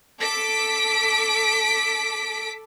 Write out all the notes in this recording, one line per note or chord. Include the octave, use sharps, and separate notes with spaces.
A4 D6 B6 D7